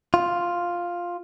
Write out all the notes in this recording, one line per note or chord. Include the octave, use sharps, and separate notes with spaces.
F4